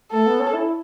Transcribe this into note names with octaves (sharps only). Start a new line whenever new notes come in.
A3 A4
B3
C#4
E4